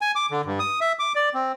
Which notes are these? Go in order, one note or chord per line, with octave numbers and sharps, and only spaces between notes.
G#5
D6
D3
G2
D#6
E5
D6
D5
C4